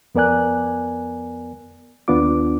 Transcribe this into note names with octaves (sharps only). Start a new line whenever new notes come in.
F2 B3 A#4 D5 G#5 F#6
D#2 B3 D4 F4 D6